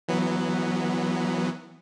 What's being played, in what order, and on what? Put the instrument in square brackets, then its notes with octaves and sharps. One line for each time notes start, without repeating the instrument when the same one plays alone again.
[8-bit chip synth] E3 F#3 B3